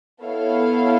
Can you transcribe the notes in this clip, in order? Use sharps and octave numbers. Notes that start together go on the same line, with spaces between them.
B3 E4 A4 C#5 F5